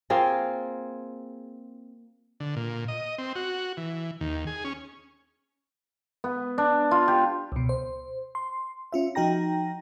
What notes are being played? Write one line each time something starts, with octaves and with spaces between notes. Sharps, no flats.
A#3 C4 F4 G#4
D3
A#2
D#5
C4
F#4
E3
D#2
G#4
C#4
B3
D4
F4
G4
C#2 B2
C5
C6
C#4 F4 E5
F3 D#4 F#4 G5 A#5 A#6